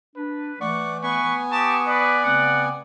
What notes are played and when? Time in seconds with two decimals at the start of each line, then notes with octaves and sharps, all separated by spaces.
0.16 D4 B4
0.61 E3 A3 D5 F#5 C#6
1.03 B3 B4 G#5 C#6
1.51 G4 A5 C#6 D#6
1.87 B4 D5
2.24 C#3 A3 C4 F#5